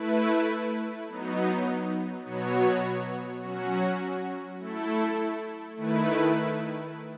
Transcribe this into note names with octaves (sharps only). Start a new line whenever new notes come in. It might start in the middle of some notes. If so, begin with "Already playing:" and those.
Already playing: A3 E4 B4
F#3 B3 D#4
B2 F#3 B3 F#4 C#5
F#3 C#4 F#4
A3 E4 A4
D#3 A3 E4 B4